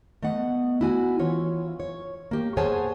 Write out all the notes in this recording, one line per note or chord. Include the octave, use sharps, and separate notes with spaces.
A3 B3 D#5 F#5
E4 F#4 G#5
E3 F4 C#5
C#5
A#3 G4
G#4 C5 C#5 F#5 G#5 A5